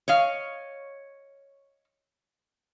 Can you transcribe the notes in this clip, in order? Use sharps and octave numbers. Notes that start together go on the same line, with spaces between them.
C#5 D#5 F5